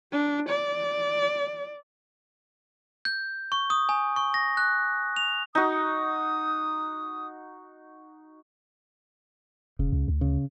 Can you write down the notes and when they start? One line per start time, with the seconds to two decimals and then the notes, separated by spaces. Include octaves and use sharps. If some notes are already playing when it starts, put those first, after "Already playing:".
0.12 D4
0.49 D5
3.05 G6
3.52 C#6
3.70 D#6
3.89 G#5
4.16 C#6
4.34 A#6
4.57 F#6
5.16 F7
5.55 D#4 F#4 D#6
9.79 E1 C#3
9.93 C#2
10.08 D2
10.21 C#3